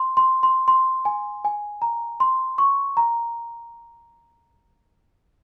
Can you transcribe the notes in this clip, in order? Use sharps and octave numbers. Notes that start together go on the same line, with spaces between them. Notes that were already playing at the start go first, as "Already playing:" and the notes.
Already playing: C6
C6
C6
C6
G#5
G#5
A#5
C6
C#6
A#5